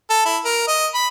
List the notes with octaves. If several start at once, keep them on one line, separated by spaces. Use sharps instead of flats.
A4
E4
A#4
D#5
B5